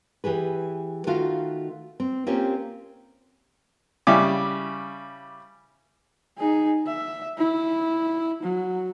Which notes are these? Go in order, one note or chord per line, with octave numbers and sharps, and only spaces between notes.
E3 G4 G#4 B4
D#3 A3 F4 F#4 F5
C4
A#3 C4 C#4 F4 G4
C#3 G3 E4 D6
D#4 G#4
E5
E4
F#3